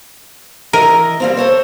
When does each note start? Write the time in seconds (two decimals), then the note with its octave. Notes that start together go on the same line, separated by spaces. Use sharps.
0.73 E3 A#4 D#5
1.20 G3 A#3 C4
1.37 A4 C5 C#5